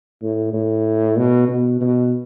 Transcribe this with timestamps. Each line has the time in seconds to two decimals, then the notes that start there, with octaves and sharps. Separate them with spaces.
0.22 A2
0.53 A2
1.17 B2
1.49 B2
1.81 B2